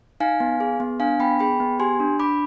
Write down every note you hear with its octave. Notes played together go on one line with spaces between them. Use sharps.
D#4 F5 G#5
B3
G#4
B3
D4 F5 G#5
B3 G5 B5
G#4 G5 B5
B3
G4 G#5 C6
D4
D4 B5 D6